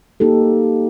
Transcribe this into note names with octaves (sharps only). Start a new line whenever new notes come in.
A#3 D#4 G4 A4